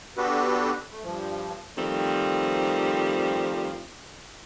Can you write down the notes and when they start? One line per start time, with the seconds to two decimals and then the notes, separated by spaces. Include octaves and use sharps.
0.17 B3 D4 F#4 G4 A4 B4
0.92 A3
1.04 G2 F3
1.78 D#3 F3 G3 A3 C4